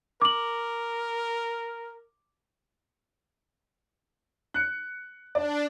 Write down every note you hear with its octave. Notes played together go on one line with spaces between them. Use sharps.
A#4 D6 F#7
F#6 C#7
D4 D5